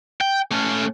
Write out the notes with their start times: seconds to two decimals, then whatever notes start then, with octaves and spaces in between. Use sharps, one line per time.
0.21 G5
0.51 A3 C#4